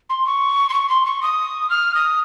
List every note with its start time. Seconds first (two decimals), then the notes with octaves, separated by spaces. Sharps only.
0.10 C6
0.26 C#6
0.70 C6
0.73 C#6
0.89 C6
1.06 C#6
1.22 D#6
1.70 F6
1.95 D#6